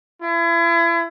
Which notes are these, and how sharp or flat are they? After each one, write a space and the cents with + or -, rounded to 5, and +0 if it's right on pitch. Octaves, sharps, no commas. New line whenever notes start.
E4 +35